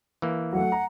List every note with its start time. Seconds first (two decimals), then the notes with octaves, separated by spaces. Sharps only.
0.22 E3 A#3
0.53 F#3 A3 F#5
0.72 A#5